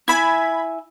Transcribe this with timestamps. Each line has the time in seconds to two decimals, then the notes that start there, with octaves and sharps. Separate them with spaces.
0.08 E4 E5 G#5 B5 G#6